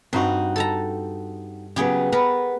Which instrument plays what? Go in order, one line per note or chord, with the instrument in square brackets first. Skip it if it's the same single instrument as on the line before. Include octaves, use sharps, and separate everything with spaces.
[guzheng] G2 [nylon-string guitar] C4 D#4 F#4
[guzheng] A4 A5 A#5
[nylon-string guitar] C#3 F#3 B3 [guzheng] G4 G#4 G5
[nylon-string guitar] B3 [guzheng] A#4 B4 A#5